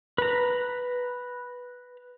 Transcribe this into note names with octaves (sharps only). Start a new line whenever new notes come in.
B4 A#5